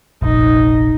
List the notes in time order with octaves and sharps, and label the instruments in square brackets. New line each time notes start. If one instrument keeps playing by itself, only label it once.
[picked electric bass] F1 A#1 [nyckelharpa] D#4